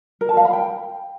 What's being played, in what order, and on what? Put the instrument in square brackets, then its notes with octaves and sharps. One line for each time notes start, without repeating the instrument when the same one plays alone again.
[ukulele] A#4
A5
F5
B5
G5